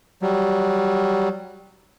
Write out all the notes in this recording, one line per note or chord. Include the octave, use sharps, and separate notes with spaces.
F#3 G3